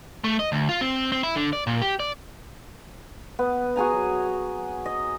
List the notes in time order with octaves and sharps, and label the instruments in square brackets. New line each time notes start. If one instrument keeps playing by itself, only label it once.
[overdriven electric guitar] A3
D#5
D2
F4
C4
C4
E4
D3
D5
A#2
G4
D5
[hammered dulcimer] B3
F#4 G#4 G#5 A#5
F#3
D#5